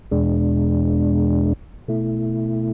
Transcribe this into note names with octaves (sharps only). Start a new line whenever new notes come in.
E2 B2 G#3 D4
B2 A3 E4